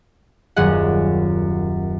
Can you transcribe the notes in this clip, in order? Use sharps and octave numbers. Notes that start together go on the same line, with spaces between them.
D#1 F#2 G#4 F#5